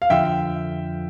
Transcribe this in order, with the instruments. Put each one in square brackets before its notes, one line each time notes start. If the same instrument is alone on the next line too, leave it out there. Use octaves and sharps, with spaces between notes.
[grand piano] F5
[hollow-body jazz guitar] F2 D3 F3 [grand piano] E5 G5